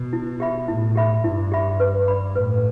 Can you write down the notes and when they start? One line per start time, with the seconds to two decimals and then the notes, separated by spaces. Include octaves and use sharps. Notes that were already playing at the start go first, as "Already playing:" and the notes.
Already playing: B2
0.13 E4
0.40 G4 E5 B5
0.68 A2 E4
0.95 G4 E5 B5
1.24 G2 E4
1.52 G4 E5 B5
1.80 B4
2.08 D5 B5
2.35 A2 B4